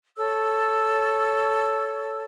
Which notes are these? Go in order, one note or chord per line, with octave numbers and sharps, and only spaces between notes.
A4 C#5 E6